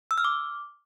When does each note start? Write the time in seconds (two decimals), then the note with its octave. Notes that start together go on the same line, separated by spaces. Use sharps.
0.11 E6
0.18 F6
0.24 D6